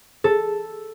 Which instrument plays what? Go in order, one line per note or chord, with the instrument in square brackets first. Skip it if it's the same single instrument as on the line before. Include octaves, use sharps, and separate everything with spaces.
[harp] A4